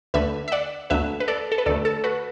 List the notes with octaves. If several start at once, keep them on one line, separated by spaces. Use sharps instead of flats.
D2 D3 A3 B4 E5
E5
D5 F#5
D2 D3 A3 B4 E5
B4
A4 D5
A4
B4
D2 D3 A3 A4 D5
A4
F#4 B4